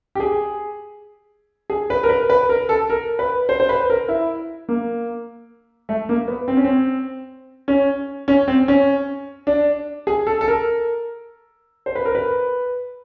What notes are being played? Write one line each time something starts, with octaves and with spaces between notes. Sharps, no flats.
G4
G#4
G#4
B4
A#4
B4
B4
A#4
A4
A#4
B4
C5
C5
B4
A#4
E4
A#3
A3
A#3
B3
C4
C#4
C4
C#4
C#4
C4
C#4
D4
G#4
A4
A4
A#4
C5
B4
A#4
B4